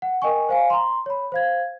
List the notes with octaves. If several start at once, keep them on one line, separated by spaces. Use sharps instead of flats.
F#5
A#4 D#5 G5 G#5 C#6
C5 F5 G#5
A#5 C6
C#5 B5
C5 F5 G#6